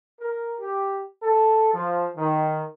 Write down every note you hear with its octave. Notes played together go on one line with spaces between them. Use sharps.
A#4
G4
A4
F3
D#3